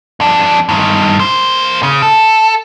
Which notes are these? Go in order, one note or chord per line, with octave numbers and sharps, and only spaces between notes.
F2 D4
G2 D#3
A#3 C5
C#3
A4